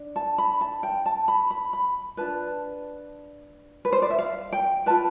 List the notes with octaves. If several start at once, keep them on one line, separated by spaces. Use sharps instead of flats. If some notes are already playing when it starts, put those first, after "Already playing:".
Already playing: D4
A5
B5
A5
G5
A5
B5
B5
B5
D4 F4 B4 A5
B4
C5
D5
E5
F5
G5
F4 B4 A5